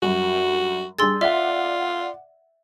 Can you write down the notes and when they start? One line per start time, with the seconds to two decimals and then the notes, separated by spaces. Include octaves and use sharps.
0.02 F#2 G3 F#4
0.98 G3 D4 G#4 C6 E6 A6
1.21 F4 D5 E5 F#5